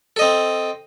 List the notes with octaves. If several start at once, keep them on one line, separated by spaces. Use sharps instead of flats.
C4 A4 D#5